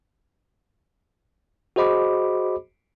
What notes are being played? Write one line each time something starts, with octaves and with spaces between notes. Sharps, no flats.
F#4 G#4 C5 D#5 B5 D6